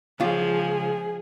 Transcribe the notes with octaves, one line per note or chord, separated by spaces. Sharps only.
C#2 F3 F4 G#4